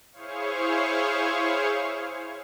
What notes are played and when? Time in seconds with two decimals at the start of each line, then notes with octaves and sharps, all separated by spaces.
0.13 E4 G#4 C5 C#5 F5 C#6